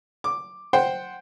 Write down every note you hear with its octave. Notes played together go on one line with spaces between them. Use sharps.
D6
C5 F#5 G5